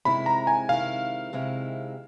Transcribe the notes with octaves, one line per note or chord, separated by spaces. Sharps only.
C3 D#3 G#3 C4 E4 B5
A#5
G#5
C3 D#3 G#3 C4 E4 F5
C3 D#3 G#3 C4 E4